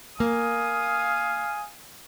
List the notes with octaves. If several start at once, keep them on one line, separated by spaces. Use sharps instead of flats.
A#3 F5 G#5 D#6